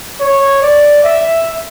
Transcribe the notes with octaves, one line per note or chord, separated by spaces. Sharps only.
C#5
D5
E5